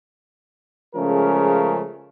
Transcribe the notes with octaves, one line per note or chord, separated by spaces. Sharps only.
C#3 F3 G#3 A3 C#4 A#4